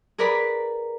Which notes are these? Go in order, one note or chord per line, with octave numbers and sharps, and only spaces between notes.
G#4 A#4 B4 D5 A#5 B5